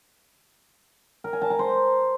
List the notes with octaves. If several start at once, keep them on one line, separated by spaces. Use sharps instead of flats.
A#4
G#5
A5
A#5
C5